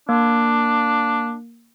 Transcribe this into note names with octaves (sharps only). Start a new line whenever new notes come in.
A#3 D4